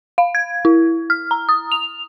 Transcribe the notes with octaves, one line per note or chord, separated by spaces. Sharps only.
F5
G#6
E4
F6
A#5
D#6
F7